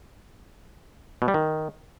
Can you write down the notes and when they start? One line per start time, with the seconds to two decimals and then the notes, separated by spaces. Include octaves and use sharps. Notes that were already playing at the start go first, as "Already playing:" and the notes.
1.22 B2
1.28 G3
1.34 D#3